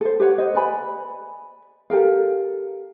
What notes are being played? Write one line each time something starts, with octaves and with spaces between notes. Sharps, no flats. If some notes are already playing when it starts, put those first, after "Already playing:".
A4 C5
G4 B4 C#5 F#5
C5 D#5
B4 D5 G#5 B5
G4 A4 A#4 F5